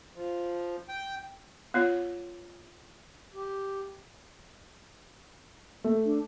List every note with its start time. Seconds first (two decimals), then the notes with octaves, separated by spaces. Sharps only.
0.15 F3
0.88 G5
1.74 B3 F4 C#5
3.34 G4
5.84 A3
6.05 D4